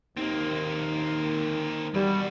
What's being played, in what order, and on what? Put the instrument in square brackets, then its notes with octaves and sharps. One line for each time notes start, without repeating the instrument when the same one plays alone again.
[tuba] D#2 [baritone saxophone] D#3 [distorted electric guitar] A#3 C4
[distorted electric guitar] E2 F#4 [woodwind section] G3